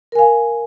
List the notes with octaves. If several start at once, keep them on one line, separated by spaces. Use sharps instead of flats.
A#4 F5 G#5